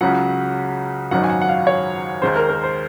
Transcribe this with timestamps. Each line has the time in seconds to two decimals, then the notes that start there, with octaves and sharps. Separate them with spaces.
0.01 C#2 C#3 F#3 F#5
1.11 G#1 F#2 D#3 F#3 F#5
1.24 G#5
1.30 F#5
1.41 F#5
1.48 F5
1.67 C#5
2.22 D#2 D#3 G#3 C5
2.36 A#4
2.49 A#4
2.63 C5